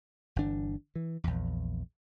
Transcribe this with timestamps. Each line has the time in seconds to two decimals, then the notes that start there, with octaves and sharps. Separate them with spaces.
0.36 G1 E3 D4
0.96 E3
1.24 A#1 E2